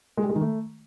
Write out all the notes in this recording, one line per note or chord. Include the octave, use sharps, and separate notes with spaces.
G#3
G3
G#3
D#3
A3